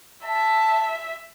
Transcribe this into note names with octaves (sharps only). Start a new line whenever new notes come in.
E5 A5